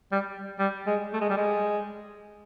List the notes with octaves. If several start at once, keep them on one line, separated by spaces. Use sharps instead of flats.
G3
G3
G#3
A3
G#3
G3
G#3